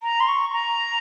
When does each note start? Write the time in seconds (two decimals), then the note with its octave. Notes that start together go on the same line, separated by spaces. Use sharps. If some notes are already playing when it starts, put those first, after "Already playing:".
0.03 A#5
0.20 C6
0.28 C#6
0.53 A#5